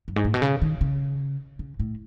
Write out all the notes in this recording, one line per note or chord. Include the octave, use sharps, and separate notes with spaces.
F#2
G#2
A2
B2
C#3
D#3
C#3
C#3
A2